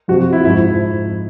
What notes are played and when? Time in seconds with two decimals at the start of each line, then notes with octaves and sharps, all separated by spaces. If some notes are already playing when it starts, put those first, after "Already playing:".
0.08 F2 C3 F3 F#4
0.33 E4
0.44 G#2 F3 E4